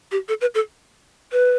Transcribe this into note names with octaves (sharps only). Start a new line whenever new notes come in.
G4
A4
B4
A4
B4